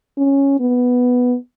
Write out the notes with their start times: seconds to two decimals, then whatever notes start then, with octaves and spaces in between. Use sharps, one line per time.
0.18 C#4
0.60 B3